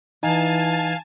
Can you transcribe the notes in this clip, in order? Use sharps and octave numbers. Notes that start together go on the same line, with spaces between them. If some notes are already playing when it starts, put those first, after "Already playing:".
E3 D#4 F5 G#5 A5